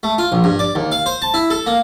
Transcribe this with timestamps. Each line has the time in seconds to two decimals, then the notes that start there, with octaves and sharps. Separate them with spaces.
0.03 A3
0.18 F4
0.32 A#1
0.44 G2
0.59 D5
0.75 D#2
0.92 F5
1.06 C5
1.22 A5
1.34 E4
1.50 A4
1.66 A#3